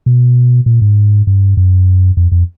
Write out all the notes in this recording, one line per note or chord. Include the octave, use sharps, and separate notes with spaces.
B2
A#2
G#2
G2
F#2
F2
F2